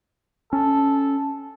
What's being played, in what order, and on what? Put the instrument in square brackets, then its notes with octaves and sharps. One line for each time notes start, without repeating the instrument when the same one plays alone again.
[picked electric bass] C#4 [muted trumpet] A4